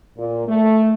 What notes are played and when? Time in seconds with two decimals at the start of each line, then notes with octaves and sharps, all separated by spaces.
0.18 A#2
0.48 A3